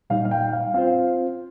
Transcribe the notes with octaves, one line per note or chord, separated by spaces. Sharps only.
A#2 G3 D#4 F5
F5
G5
F5
C4 F4 C5 F5